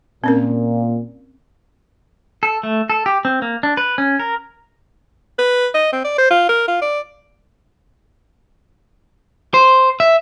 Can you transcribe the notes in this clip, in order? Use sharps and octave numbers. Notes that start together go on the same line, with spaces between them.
A#2 C4 C#4 A#4
A4
A3
A4
G4
C4
A#3
D4
B4
C#4
A#4
B4
D#5
C4
D5
C5
F4
A#4
F4
D5
C5
E5